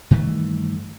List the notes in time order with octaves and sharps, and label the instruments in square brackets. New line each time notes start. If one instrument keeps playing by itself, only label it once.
[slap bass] G2 D#3 E3 A3